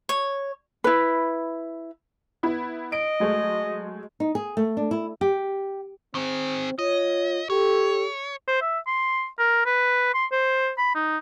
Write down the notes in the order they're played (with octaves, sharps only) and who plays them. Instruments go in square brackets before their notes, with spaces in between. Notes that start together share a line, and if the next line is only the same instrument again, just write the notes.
[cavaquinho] C#5
[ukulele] E4 B4
[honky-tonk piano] B3 E4
[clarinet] D#5 [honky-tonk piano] D7
[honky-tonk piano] F#3 G#3 A3
[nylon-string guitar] D#4
G#4
A3
D4
E4
G4
[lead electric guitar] D#3 G#4 [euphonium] C4
[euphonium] F4 [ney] C#5 [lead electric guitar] D#5
[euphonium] G4 [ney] A4 [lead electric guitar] C#5
[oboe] C5
E5
C6
A#4
B4
C6
C5
B5
D#4